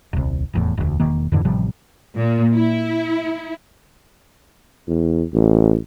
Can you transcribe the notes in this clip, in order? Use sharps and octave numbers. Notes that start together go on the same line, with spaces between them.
D#1 C2
F1 E2 A2
E1 D2
E1 D#3 A#3
F2 G#2 D3 E3
A1 C3 F3 G3
A#2
E4
E2
A1